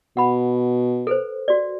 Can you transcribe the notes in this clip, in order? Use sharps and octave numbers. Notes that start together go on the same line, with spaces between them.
B2 F#5 B5
A4 B4 C5
F#4 D5